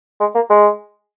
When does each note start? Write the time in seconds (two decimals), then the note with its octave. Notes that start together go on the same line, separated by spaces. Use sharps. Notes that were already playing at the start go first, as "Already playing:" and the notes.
0.21 G#3
0.35 A#3
0.50 G#3